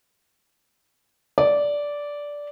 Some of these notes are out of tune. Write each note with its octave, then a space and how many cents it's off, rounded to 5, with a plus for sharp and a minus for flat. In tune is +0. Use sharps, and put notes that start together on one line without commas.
D5 -10